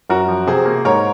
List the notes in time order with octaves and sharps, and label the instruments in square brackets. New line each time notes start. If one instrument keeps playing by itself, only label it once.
[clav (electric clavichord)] F#2 [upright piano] F#4 A#4
[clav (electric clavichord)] F3
[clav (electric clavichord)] C3 [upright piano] G#4 C5
[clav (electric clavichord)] A#3
[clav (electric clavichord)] G#2 [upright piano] A#4 C#5